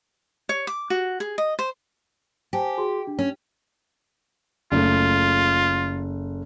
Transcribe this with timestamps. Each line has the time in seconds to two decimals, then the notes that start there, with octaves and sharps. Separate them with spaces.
0.49 C#5
0.67 D6
0.90 F#4
1.20 G#4
1.38 D#5
1.59 C5
2.53 G4 C5 G#5 A5
2.77 F#4 G#4 C6
3.07 D4
3.19 C#4
4.72 F#1 A3 F4